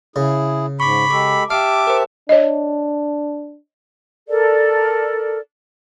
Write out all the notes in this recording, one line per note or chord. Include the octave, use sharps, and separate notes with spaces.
C#3 E4 G#4
G#2 B5 C#6 D6
G#3 G4 A4 D6
G4 E5 F5 A5 D6 F6
A#4 C5
D4 C#5 D#5
A4 A#4 D5